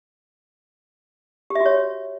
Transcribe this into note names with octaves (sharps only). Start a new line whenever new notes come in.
G4
E5
F#4
C#5